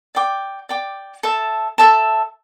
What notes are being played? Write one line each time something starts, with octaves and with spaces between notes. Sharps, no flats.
D5 G5 D6
D5 G5 D6
A4 E5 A5
A4 E5 A5